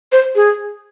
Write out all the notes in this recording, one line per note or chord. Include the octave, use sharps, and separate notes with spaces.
C5
G#4